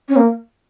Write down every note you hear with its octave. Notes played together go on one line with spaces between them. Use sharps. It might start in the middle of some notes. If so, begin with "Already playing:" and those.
C#4
A#3